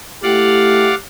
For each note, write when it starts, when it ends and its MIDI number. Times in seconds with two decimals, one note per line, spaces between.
0.23 0.93 57
0.23 0.93 64
0.23 0.93 67
0.23 0.95 74
0.23 0.95 77
0.23 0.95 78